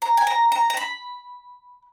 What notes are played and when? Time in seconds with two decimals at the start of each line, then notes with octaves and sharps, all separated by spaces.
0.02 A#5
0.17 G#5
0.27 A#5
0.52 A#5
0.70 A#5
0.77 B5